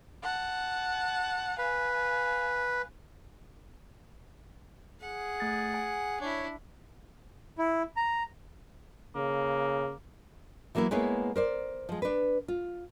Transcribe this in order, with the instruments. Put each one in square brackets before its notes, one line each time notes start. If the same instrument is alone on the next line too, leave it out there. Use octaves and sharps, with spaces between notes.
[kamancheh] F#5 A5
[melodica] B4 [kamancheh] F5 G#5
[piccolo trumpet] G#4 [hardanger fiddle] F#5
[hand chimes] A3 A6
G#5
[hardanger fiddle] D4 E4 [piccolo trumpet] C#5
[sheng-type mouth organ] E4
A#5
[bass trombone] C#3 [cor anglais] A#3
[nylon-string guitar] E3 F#3 A#3 B3 E4
G#3 A#3 B3 E4 B4 C#5
A#4 C5 D5
F3 G#3
D4 B4
F4